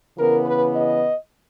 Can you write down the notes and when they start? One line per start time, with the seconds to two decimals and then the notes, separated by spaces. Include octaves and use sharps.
0.17 C#3 E3 B3 A#4
0.46 B4
0.75 D#5